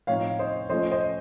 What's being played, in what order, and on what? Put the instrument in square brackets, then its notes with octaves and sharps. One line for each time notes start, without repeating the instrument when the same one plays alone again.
[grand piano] A2 F3 C4 D#4 C#5 F5
C5 D#5
F3 A3 C#4 F4 C5 D#5
C5 D#5